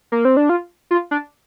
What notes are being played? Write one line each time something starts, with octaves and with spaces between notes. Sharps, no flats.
A#3
C4
D4
F4
F4
D4